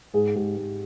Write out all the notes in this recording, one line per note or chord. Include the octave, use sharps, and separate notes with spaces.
G#2 G#4
G#2 G4
G#2